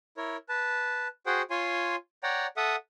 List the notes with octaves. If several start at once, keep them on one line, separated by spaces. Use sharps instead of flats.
E4 A#4 C#5
B4 A5
F#4 G#4 C5 F#5 G5
F4 C#5 G#5 C6
C#5 D5 F#5 G5 A#5
A4 E5 F#5 D#6